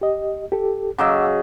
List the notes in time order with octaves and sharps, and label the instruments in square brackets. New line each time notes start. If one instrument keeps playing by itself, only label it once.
[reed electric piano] G4 D#5
G4 A4
[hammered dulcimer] C#3 F#3 D#5 [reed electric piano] F#5 D6 E6